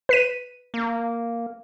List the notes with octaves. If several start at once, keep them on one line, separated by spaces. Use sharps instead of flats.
B4 B6 D#7
A#3